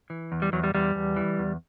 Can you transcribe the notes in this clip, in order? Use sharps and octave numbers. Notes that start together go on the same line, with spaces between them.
E3
E2
G3
E2 F#3
G3
E2 G3
E2
E3
E2